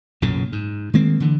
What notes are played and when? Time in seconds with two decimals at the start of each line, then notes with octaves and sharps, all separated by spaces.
0.22 B1 F#2 A#2 C#3
0.52 G#2
0.94 D#3 G#3 A#3 C4
1.20 D3 E3